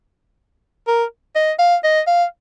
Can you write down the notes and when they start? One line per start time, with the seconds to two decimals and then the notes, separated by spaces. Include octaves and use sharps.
0.87 A#4
1.36 D#5
1.59 F5
1.84 D#5
2.07 F5